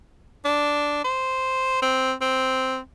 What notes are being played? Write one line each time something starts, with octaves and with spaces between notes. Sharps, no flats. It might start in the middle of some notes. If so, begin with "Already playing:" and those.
D4
C5
C4
C4